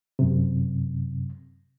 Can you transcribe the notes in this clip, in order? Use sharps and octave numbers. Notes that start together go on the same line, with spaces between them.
F#2 C3